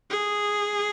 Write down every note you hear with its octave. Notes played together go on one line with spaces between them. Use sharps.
G#4